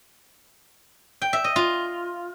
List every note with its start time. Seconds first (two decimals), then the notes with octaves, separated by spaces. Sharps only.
1.22 G5
1.33 E5
1.44 D#5
1.56 F4